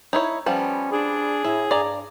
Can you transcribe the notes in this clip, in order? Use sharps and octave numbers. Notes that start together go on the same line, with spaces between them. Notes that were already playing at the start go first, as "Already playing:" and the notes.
D#4 E4 C#5
F3 G3 B3 C#4
D4 G#4
A2 E4
G2 D5 A#5